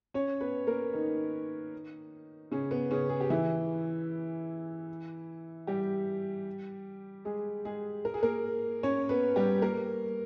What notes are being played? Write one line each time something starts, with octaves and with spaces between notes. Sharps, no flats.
C#4 C#5
B3 B4
A#3 A#4
D#3 D#4
C#3 C#4
B3
C#3 C#4
G#4
G4
E3 E4
G3 G4
G#3 G#4
G#3 G#4
A#4
G#4
A#3 A#4
C#4 C#5
B3 B4
G3 G4
A#3 A#4